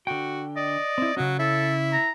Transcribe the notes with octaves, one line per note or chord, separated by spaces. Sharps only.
D3 F#4 G5
D5 D#5
C4 E4
C#3 F#3 C#4
E4 A4
A#5